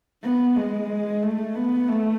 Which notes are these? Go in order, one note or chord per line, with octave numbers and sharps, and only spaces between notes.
B3
G#3
A3
B3
A3